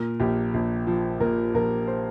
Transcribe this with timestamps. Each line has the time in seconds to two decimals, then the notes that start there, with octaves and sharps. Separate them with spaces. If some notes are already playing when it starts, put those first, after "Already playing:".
Already playing: A#2 A#4
0.20 A#1 G4
0.54 A#1
0.87 F3
1.20 A#2 A#4
1.54 A#1 A#4
1.87 C5